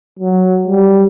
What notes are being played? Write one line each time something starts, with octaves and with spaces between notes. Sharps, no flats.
F#3
G3